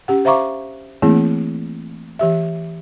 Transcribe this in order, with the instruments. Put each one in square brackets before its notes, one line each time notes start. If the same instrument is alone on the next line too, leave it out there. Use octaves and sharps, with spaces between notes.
[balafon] C#4 G4 F#5
C5 E5 F5 A#5 C#6 D6
E3 A3 A#3 C4 E4 G#4
E3 G4 E5